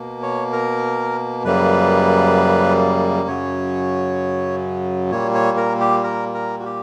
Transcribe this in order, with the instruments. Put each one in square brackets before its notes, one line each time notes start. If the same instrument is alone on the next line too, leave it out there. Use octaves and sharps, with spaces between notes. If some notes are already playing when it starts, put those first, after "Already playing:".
Already playing: [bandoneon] B2 A#3
C#5
A#4
F#2 C#3 G3 A#3 B4
F#2 C#3 F#3 C#5
A#2 G3 A#3 C#5
C#5
A#4
G4
A#4
A#4
F#4
G4